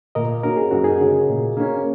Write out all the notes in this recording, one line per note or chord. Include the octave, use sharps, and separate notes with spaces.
A#2 A#4 D#5
A#3 C#4 F#4 A#4
G#4
F#2 F#4
D#4 G#4
C#3 G#3 F#4 C#5
A#2
A#3 C#4